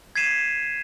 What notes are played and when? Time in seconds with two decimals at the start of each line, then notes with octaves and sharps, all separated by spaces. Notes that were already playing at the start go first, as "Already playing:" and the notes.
0.16 G#6 B6 C7 D#7 E7